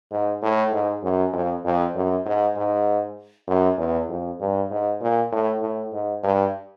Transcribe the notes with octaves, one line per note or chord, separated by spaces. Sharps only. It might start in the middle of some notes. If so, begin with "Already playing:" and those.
G#2
A2
G#2
F#2
F2
F2
F#2
G#2
G#2
F#2
E2
F2
G2
G#2
A#2
A2
A2
G#2
G2